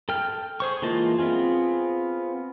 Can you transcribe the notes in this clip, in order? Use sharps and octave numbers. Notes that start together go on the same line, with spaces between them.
A4 G5 F6
G#4 C5 C#6
E3 G#3 A#3 F4 A5
B3 C4 F4 G#4